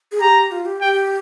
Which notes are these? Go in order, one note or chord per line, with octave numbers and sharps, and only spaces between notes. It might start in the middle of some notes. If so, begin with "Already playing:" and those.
G#4
G4 A#5
F4
G4
G4 G5